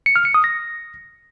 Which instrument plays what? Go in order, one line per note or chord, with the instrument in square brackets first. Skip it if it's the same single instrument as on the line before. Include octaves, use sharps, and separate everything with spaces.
[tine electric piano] C#7
F6
C#7
D#6
A#6